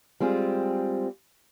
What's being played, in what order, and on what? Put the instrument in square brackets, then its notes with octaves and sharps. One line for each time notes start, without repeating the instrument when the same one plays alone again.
[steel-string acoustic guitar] G3 G#3 C4 F4 G#4